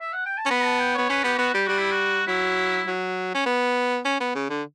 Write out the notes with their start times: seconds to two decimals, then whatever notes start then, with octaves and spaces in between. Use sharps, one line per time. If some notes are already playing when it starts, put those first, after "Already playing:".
0.00 E5
0.13 F#5
0.26 G5
0.37 A5
0.45 C#4
0.50 B3 B5
0.64 A5
0.79 G5
0.95 B3 C#5
1.09 C#4 B4
1.24 B3 G4
1.38 B3 F#4
1.54 G3 G4
1.66 G3 F#4
1.78 E4
1.91 F#4
2.27 F#3 E4
2.87 F#3
3.34 C#4
3.46 B3
4.05 C#4
4.20 B3
4.35 C#3
4.50 D3